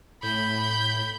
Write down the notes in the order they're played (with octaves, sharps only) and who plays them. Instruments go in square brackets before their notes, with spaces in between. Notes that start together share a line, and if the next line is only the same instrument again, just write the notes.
[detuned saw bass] A2 [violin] B5 G6